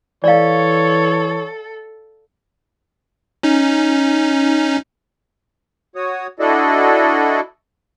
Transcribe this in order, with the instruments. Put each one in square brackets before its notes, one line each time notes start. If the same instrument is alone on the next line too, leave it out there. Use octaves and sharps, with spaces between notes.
[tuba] E3 [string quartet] A4 [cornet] C#5 [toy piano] D5 F5
[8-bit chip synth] C#4 D#4
[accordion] F#4 C#5 D#6
D4 E4 F#4 A4 D5 D#5